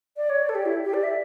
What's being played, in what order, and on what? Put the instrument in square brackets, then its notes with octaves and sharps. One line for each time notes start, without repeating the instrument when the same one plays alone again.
[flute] D5
C#5
D5
A4
G4
E4
G4
D5
E5